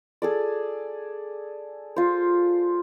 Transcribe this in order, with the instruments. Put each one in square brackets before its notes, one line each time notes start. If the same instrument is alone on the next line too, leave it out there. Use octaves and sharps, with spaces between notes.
[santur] G#4 A4 D5
F4 C5